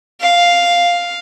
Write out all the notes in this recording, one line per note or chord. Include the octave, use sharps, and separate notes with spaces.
F5